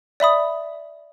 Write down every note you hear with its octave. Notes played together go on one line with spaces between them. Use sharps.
D5 E5 B5 D#6